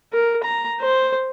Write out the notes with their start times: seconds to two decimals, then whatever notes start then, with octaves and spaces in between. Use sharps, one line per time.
0.13 A#4
0.44 A#5
0.81 C5